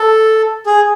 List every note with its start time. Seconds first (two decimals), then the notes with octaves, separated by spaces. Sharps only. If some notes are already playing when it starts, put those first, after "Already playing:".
Already playing: A4
0.66 G#4